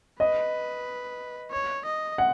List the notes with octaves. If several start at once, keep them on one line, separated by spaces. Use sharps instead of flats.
B4 D#5
C#5
D#5
F#5